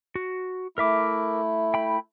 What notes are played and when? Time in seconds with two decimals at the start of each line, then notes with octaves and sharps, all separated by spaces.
0.15 F#4
0.78 A3 E4 A#4 E5 D6
1.74 G5 B5